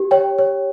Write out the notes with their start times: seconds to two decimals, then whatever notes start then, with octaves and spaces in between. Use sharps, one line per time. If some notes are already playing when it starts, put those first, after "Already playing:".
Already playing: G4
0.11 C#5 G5
0.39 C#5